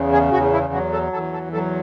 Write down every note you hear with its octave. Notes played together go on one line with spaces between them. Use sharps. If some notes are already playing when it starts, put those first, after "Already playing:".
Already playing: E2 C#3
G#4
E2 F#4
E4
F#3 F#4
A4
E2 A4
A4
F#3 A4